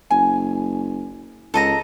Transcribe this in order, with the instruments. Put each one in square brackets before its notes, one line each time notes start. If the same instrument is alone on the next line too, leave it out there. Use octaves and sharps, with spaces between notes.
[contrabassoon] F#1 [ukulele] G#5
[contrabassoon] C#2 [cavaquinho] A4 D#5 A#5